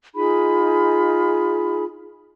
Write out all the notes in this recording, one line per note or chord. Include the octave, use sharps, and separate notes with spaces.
D#4 F4 G#4 B5